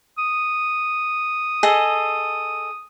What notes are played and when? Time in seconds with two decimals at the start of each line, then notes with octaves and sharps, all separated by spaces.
0.18 D#6
1.63 G#4 A4 D#5